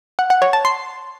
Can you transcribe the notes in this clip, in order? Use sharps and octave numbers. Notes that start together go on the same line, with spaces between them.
F#5
F#5
C#5
A5
C6